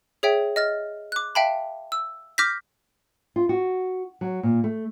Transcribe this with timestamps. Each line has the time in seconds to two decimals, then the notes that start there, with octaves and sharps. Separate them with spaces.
0.23 G#4 C#5 E5 G5
0.56 D#5 F6 A6
1.12 D6 F#6
1.35 E5 F5 G5 A5 B5
1.92 E6
2.38 D6 F6 G6 A#6 B6
3.36 F4
3.49 F#4
4.21 F#3
4.43 A#2
4.64 A3